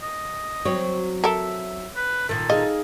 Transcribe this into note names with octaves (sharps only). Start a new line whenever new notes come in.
D#5
F#3 C4 C#5
A4 A#4 E5
B4
A#2 D#3 A4
D#4 G#4 D#5 F5